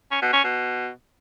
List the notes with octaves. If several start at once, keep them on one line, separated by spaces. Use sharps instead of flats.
C#4
B2
C#4
B2